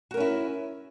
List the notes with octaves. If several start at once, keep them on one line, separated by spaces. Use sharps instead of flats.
C#4 E4 F#4 A#4